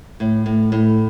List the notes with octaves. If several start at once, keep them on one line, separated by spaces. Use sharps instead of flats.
A2
A2
A2